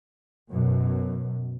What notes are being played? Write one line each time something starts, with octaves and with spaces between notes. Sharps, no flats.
F#2 B2